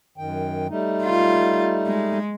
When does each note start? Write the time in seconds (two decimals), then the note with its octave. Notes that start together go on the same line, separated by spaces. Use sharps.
0.17 F#2 D#3 G5
0.69 G3 A3 D#4
1.02 F4
1.87 G#3